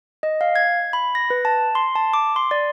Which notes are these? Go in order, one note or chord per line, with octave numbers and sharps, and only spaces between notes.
D#5
F5
G#6
B5
A#6
B4
A5
C6
A5
D6
C6
D5